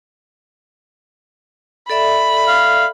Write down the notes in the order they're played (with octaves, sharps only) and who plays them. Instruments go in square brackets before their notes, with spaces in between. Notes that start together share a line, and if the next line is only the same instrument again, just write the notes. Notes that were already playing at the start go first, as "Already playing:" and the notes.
[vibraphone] A4 D5 E5 [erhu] B5
[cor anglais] F5